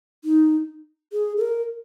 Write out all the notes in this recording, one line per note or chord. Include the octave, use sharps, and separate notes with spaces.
D#4
G#4
A4
A#4